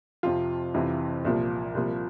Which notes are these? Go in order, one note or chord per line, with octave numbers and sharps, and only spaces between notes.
F2 C3 F3 F4
F2 C3 E3
C2 A#2 F3
C2 A#2 F3